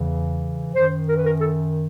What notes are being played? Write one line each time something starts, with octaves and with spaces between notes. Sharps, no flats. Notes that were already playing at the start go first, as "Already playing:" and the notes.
Already playing: E2 C#3 E3
F#2 D#3 C5
A#4
B4
A#4
A4